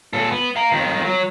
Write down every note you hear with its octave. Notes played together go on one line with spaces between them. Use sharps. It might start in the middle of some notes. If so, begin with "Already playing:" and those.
A#2 A4
B3
F5 A#5
F2 D#3
F#3